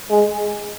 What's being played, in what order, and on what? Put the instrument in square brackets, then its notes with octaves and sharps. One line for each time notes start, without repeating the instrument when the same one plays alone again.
[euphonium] G#3